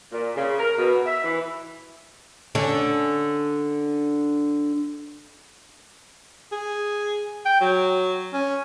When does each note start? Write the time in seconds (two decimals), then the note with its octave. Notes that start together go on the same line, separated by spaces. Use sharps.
0.11 A#2
0.35 C#3
0.58 A#4
0.78 B2
1.05 E5
1.23 E3
2.55 D3 C#4 D4
6.52 G#4
7.45 G5
7.61 F#3
8.33 C#4